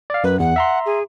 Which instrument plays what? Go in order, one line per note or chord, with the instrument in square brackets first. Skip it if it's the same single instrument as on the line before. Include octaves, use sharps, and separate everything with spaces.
[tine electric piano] D5 F5
[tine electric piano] F#2 [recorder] B4
[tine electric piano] E2 [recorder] F#5
[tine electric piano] E5 A#5 C6
[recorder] G#4